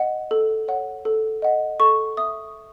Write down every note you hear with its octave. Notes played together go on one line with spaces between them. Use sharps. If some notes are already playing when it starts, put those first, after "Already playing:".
Already playing: D#5 F#5
A4
C#5 F#5
A4
D#5 F#5
A4 C#6
E5 D#6